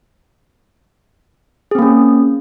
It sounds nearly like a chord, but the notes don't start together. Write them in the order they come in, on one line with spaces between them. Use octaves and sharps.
G#4 C4 A#3 C#4